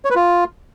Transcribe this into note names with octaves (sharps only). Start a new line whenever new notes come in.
C#5
B4
F4